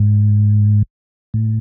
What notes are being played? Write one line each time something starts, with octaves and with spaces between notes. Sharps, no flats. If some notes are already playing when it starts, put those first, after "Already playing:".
Already playing: G#2
A2